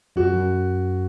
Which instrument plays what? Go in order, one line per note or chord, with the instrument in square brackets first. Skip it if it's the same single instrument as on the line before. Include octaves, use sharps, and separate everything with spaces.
[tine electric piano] F#2 [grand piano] F#4
[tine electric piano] F#2